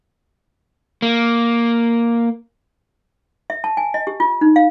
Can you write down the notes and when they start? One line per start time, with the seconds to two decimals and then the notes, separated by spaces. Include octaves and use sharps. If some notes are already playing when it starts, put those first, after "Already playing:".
1.02 A#3
3.50 E5
3.64 A5
3.77 G#5
3.94 D#5
4.07 G4
4.20 F4
4.41 D#4
4.56 F5